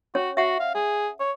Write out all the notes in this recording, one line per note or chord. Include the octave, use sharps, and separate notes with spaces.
C#4 F#4 C#5
F#4 E5 F#5
F5
G#4
C#5